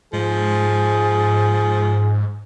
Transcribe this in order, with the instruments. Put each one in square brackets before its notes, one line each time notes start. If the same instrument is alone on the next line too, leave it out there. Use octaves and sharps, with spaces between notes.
[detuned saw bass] G#2 [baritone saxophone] F3 [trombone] G#4